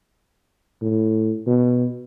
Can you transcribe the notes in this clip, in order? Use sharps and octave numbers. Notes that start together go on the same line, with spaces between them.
A2
B2